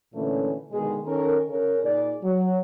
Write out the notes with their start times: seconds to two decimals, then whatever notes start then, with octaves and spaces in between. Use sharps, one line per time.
0.14 A#2 D3 E3 A3 C#4
0.72 B2 D3 D#3 G#3 G#4
1.05 D#3 C#4 A4 A#4
1.49 C#3 C#4 A#4
1.83 A#2 D#4 G#4 D5
2.23 F#3